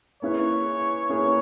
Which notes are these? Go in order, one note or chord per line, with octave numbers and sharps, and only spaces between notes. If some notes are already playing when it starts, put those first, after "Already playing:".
A#3 C#4 E4 G#4 B4 C#5
A#3 C#4 E4 G#4 B4 C#5